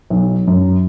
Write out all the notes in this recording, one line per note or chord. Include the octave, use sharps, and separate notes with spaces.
B1
F#2